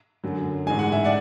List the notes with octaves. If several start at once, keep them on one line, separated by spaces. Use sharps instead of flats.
F#2 D3 F#3
A1 G#2 G#3 G#5
F#5
E5
D5 F#5